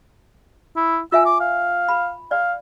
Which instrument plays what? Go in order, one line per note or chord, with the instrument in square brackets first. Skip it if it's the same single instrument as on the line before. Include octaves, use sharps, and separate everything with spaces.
[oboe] E4
[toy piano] F4 E5 G#5 [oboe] E6
[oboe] D6
F5
[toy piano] B5
[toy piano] D5 [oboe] F5